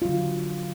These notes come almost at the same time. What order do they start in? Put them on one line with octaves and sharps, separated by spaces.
F4 F#3 D3